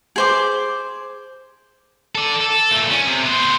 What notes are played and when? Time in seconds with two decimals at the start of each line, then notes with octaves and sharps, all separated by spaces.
0.16 G#4 C5 D6
2.15 A4 D5
2.41 A4
2.72 A#2 A3
2.91 C#4
3.08 C3
3.24 B3 C5